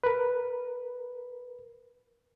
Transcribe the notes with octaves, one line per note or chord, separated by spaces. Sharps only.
A#4 B4